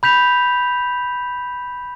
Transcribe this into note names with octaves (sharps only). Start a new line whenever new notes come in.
B5 G6 B6 F7